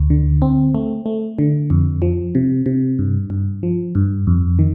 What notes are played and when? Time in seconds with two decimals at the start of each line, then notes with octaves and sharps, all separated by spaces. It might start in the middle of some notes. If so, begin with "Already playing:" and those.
Already playing: D2
0.10 D3
0.42 C4
0.75 A3
1.06 A3
1.39 D3
1.70 F2
2.02 F3
2.35 C3
2.66 C3
2.99 G2
3.30 G2
3.63 F3
3.95 G2
4.27 F2
4.59 D#3